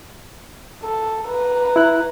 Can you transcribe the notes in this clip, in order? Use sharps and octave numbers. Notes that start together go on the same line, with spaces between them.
A4
B4 A#5
E4 F#6